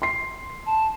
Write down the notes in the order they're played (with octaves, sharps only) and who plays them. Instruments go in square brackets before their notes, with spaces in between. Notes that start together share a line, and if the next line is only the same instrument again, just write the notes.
[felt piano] C6 C7
[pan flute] A5